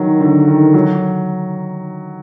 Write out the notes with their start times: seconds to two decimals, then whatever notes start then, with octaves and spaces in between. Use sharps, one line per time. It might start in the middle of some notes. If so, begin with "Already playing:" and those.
Already playing: D#3 F#3
0.20 D3
0.47 D#3
0.74 F#3